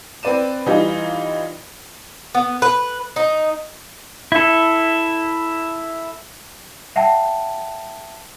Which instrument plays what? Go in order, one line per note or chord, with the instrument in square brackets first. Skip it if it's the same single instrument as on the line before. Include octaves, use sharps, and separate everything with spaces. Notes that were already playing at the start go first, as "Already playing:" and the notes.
[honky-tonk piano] C4 B4 D5 D#7 E7
E3 G3 D#4 F4
[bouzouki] B3
B4
D#4
[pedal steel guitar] E4 A4
[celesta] E5 F#5 G5 A5